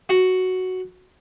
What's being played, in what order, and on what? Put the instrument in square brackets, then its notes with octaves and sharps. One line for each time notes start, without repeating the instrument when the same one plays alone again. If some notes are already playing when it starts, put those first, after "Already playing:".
[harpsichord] F#4